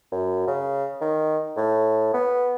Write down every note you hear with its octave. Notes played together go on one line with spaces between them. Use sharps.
F#2
C#3
D#3
A2
B3